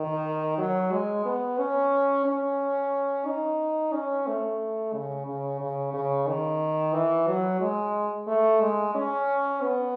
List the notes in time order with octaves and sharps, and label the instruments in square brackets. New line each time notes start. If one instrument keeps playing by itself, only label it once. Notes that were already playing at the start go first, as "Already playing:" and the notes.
Already playing: [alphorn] D#3
F#3
G#3
B3
C#4
C#4
D#4
C#4
A3
C#3
C#3
C#3
C#3
D#3
E3
F#3
G#3
A3
G#3
C#4
B3